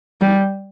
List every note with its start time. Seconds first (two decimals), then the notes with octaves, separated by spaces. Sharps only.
0.21 G3